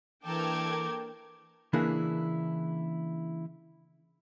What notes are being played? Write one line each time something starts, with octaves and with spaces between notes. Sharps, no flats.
E3 A#3 D4 A4 A#4 G5 D6 G#6
C#3 E3 A#3 D4 E4 G#4